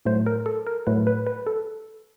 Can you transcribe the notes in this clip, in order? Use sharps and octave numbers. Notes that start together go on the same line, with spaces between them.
A2 F#3 A3 C5
A#4
A4
A#4
A2 F#3 A3 B4
B4
B4
A4